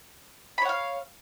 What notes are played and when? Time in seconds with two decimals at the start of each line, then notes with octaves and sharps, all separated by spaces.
0.58 B5
0.62 C#5
0.65 F#5
0.69 F5